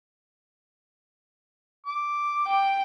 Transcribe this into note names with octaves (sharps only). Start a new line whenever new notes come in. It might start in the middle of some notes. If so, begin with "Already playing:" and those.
D6
G5